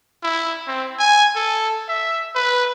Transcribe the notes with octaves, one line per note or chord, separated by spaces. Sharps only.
E4
C4
G#5
A4
E5
B4